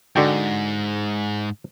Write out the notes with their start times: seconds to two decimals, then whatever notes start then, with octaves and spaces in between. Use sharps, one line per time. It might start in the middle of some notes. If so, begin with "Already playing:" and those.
0.16 G#2 D3 F#4 G5